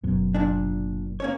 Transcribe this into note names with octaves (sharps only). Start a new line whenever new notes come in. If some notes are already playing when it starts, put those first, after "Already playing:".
F#1 F#2 B2
A#2 D4
A#3 C#4 C#5